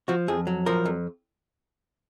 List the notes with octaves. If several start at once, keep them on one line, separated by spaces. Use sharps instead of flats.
F3 F#4
F2 G#4
F#3
F3 A#4
F2